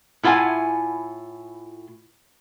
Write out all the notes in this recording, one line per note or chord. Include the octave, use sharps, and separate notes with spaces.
A2 E4 F4 F#5 G#5